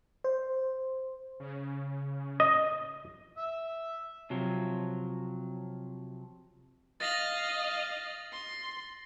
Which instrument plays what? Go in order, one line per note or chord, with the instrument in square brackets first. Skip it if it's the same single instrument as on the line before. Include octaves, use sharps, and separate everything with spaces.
[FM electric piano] C5
[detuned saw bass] C#3
[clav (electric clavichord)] D#5
[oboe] E5
[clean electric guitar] C3 F3 F#3
[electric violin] D#5 F5 [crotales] A6 A#6 F#7
[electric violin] C6